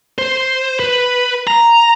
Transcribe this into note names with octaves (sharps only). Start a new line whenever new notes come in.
C5
B4
A#5